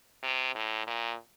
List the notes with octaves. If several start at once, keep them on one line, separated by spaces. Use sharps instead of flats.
C3
A2
A#2